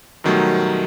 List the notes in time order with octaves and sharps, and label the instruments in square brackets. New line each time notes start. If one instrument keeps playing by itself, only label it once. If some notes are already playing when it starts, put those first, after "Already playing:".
[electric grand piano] F#2 B2 D#3 F#3 G3 A3